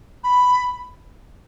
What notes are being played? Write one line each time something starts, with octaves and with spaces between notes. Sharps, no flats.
B5